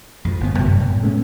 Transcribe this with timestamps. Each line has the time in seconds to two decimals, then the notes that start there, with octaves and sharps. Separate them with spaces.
0.25 F2 A2 F3
0.40 G1 B3
0.59 F#2 C3
0.80 A2
1.02 G#3 A3 B3 C#4